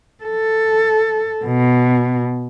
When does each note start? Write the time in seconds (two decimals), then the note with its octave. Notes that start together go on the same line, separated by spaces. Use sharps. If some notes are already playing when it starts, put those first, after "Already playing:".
0.24 A4
1.45 B2